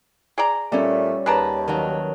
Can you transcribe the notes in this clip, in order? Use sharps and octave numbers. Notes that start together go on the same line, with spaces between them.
G#4 D5 A#5
A#2 G3 A3 C#4
D#2 G#4 B4 D5 A5 A#5
D#3 F#3